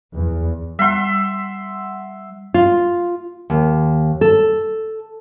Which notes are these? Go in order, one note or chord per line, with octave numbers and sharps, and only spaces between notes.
E2
G3 E5 F#5 C6
F4
D#2
A4